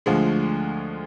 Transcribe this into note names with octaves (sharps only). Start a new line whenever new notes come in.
D2 D3 F3 G#3